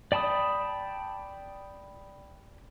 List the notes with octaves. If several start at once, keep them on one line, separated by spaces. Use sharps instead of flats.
D5 G5 A5 B5 D#6